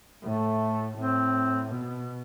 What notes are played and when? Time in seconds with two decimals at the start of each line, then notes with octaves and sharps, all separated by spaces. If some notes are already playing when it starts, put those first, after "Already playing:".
0.23 A2 A3
0.97 A2 C4
1.71 B2